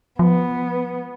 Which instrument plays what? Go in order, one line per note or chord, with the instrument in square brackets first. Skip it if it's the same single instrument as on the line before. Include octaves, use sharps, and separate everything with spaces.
[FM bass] F3 [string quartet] B3